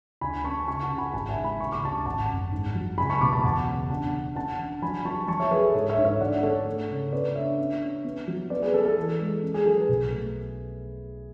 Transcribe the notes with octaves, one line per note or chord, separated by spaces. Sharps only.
D2 G#5 B5
C#4 A5 C#6
C#3 A5 C#6
F#5 A5
C#3
G#5 B5
G#1 F#5 A5
E5 G#5
G#2
G#5 B5
C#3 C#6
D6
D2 A5 C#6
G#1 F#5 A5
F#2
G#2
F#3
C#2 G#5 B5
A5 C#6
B2 B5 D6
A5 C#6
E1 F#5 A5
C#3
D3 F#5 A5
D3
C#4 F#5 A5
D3
F#3 G#5 B5
F#3 A5 C#6
F#3 A5 C#6
C#5 E5
F#3 G#4 B4
A4
G#2 A4 C#5
C#5 E5
G#2
C#5 E5
D3 D5 F#5
D3 A4 C#5
A3
C#3
B3 B4 D5
D4 C#5 E5
C#4
C#4
B3
F#3
B3 B4 D5
G#4 B4
B3 A4
A4
E3
G#3
C#4
G#4
F#3 A4
G#4 B4
B1
A3